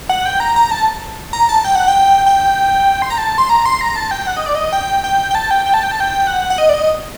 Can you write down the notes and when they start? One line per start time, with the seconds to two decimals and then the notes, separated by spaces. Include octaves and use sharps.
0.09 F#5
0.25 G5
0.40 A#5
0.56 A#5
0.71 A5
1.33 A#5
1.49 A5
1.65 G5
1.75 F#5
1.88 G5
2.26 G5
3.02 C6
3.10 A#5
3.18 A5
3.38 C6
3.49 A#5
3.65 C6
3.81 A#5
3.96 A5
4.11 G5
4.27 F#5
4.36 D#5
4.46 D5
4.55 D#5
4.72 G5
5.04 G5
5.31 G5
5.35 A5
5.51 G5
5.66 G5
5.74 A5
5.83 G5
5.91 A5
6.00 G5
6.27 F#5
6.50 F#5
6.58 D#5
6.69 D5
6.74 D#5